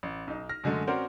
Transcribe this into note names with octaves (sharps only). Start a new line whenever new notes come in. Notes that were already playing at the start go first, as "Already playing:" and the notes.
A1
B1 D#4
F6 A#6
F#2 D3 G#3 A3
C4 C#4 F#4 A#4 C5 D5